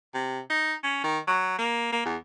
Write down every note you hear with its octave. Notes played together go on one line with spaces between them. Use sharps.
C3
D#4
C#4
D#3
F#3
A#3
A#3
E2